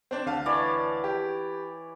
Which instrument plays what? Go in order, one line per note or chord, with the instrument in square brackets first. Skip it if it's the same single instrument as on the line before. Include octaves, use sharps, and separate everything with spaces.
[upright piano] C4 D4
D2 F5 A5
[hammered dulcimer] E3 C#5 D5
[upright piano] G4